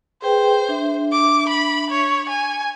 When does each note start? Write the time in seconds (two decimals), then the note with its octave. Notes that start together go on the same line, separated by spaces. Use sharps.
0.22 G#4 B4 C5 G5
0.68 D4 E5
1.12 D6
1.49 B5
1.91 C#5
2.29 G#5